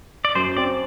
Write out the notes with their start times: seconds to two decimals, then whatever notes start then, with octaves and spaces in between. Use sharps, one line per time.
0.25 D5
0.35 F#2 C5
0.57 C4 D5